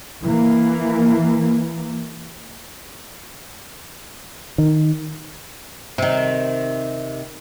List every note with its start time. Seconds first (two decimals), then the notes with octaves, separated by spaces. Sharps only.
0.24 E3 A#3
4.58 D#3
5.98 C3 D#3